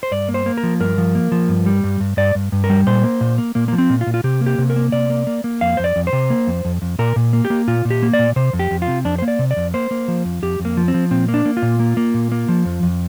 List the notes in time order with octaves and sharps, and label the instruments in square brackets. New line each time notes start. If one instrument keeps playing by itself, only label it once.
[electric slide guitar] C5
G2 D5
A#3
C5
A#3
A#4
F3
G2 A#4
F3
A#3
F3
G2
G3
G2
G2
G2 D5
G2
G2
A#4
G3
A#2 C5
A#3
A#2
A#3
A#2 A#3
F3 A#3
C4
A#2
F4
A#2
F4
C3 G4
A#3
G4
C3
A#4
A#3
C3 D5
A#3
A#3
A#3
F2 F5
F2 C5
D5
F2
C5
C3
A#3
F2
F2
F2
A#2 A#4
A#2
A#3
G4
A#3
A#2 F4
A#2
G4
A#3
D5
A#2
C3 C5
F2
G4
F2
F4
C3
F2 D4
A#3 C5
D5
C3
D5
F2
A#3 C5
A#3
F3
F2
F2 G4
F2
A#3
F3
C4
F3
A#2 C4
A#3
D4
A#3
F4
A#2
A#3
A#3
A#2
A#3
F3
F2
F2